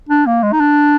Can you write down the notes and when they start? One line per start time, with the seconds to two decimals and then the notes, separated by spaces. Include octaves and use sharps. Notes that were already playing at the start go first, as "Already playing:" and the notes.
0.09 D4
0.26 A#3
0.43 G#3
0.52 D#4
0.60 D4